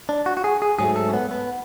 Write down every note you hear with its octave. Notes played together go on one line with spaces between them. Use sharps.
D4
F#4
F#4
G#4
G#4
G#2 F#3 A3 G#4
A4
C#4
B3
B3